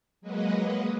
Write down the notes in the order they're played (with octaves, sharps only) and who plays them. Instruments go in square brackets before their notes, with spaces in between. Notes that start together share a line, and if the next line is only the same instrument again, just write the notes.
[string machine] F#3 G#3 A#3 F#4 B4 D#5